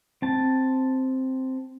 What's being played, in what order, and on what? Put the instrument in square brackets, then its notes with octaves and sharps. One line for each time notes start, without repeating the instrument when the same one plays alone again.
[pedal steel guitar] C4 A5